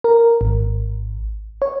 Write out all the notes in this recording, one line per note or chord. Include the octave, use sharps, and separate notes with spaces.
A#4
G#1
C#5